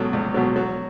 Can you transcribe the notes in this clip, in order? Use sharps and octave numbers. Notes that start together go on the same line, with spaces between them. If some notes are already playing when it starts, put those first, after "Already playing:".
Already playing: C#2 B2 F#3
C#2
B2 F#3
F#3